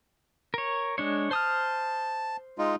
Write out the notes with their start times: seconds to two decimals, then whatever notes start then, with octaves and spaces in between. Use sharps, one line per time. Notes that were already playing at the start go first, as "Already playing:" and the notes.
0.54 A#4 C#5
0.98 G#3 D4 C#5
1.31 C5 A5 D#6 F6
2.58 G#3 D#4 F4